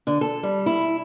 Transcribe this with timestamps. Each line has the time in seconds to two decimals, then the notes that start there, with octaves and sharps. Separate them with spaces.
0.07 D3
0.21 A4
0.43 G3
0.66 E4